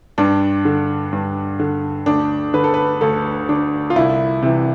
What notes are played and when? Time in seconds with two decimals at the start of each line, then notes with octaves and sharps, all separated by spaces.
0.18 G2 D4
0.65 D3
1.13 G2
1.59 D3
2.06 D2 D4
2.54 D3 B4
2.64 A4
2.74 B4
3.01 D2 A4
3.49 D3 D4
3.90 F4
3.95 C2 E4
4.42 C3 E3